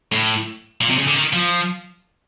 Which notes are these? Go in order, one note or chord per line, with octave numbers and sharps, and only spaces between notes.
A2
A#2
C3
C#3
D3
D#3
F3